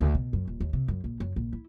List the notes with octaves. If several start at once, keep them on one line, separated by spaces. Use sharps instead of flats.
D2
B2
F#2
D#1
D#2
C3
F#2
A#1
F#2
A#1
E4